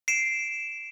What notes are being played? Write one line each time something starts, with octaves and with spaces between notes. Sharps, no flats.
C7 D7 E7